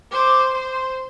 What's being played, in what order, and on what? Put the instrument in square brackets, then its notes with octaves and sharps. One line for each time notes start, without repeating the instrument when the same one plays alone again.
[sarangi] C5 [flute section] D6
[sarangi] C5 [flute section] C6